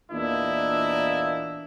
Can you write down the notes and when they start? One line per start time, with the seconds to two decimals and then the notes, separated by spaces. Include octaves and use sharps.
0.12 E2 A#2 A#3 D4 E4 D#5